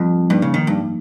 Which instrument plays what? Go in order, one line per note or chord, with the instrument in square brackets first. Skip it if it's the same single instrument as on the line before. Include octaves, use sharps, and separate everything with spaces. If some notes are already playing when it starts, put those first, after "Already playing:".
Already playing: [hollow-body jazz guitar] F2 [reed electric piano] G3 C4
[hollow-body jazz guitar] G2 [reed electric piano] F3 A#3 D#4
[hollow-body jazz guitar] C#3
D#3
G2